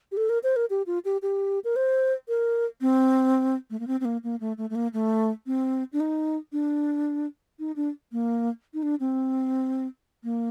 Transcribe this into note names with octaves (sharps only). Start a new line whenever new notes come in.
G4
A4
A#4
C5
A#4
G4
F4
G4
G4
A#4
C5
A#4
C4
A3
A#3
C4
C4
A#3
A#3
A3
A3
A3
A#3
A3
C4
D4
D#4
D4
D#4
D4
A#3
D#4
D4
C4
A#3